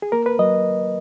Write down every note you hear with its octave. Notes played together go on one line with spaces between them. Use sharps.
G#4
A#3 A#4
B4
F#3 D#5